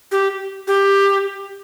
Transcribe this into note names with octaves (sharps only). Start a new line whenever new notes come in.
G4
G4